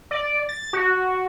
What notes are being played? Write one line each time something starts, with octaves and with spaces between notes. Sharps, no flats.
D5
A6
F#4